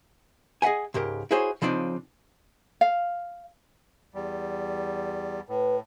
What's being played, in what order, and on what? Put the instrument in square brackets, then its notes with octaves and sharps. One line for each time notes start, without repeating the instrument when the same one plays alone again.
[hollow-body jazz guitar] G#4 D#5 E5 F#5 G#5
C#2 G#2 G4 A#4
E4 F#4 G#4 C5 C#5
C#3 F3 C4 D4 D#4
[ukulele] F5
[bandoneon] E2 G3
[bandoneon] A2 [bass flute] B4